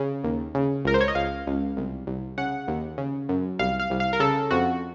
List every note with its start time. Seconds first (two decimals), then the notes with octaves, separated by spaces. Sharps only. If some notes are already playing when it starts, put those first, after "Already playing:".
Already playing: C#3
0.24 D#2
0.55 C#3
0.85 C#2 A#4
0.94 C5
1.01 C#5
1.08 D#5
1.15 C#2 F5
1.47 C#2
1.77 C2
2.07 C2
2.38 C#3 F#5
2.68 D#2
2.98 C#3
3.29 F#2
3.59 C2 F5
3.80 F5
3.90 C2
4.00 F5
4.13 A#4
4.20 C#3 A4
4.51 F2 F#4